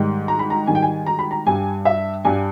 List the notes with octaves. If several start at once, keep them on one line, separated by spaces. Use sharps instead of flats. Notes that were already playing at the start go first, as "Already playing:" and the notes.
Already playing: G#2 D#3 G3
A#5
B5
A#5
G#2 D#3 G3 G#5
G5
G#5
A#5
B5
A#5
G2 G3 G#5
E5
G2 G3 G#5